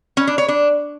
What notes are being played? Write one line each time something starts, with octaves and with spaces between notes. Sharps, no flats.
C#4
D4
C#5
D4